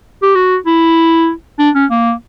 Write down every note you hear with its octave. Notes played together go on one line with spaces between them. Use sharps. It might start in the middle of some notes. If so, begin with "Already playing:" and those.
G4
F#4
E4
D4
C#4
A#3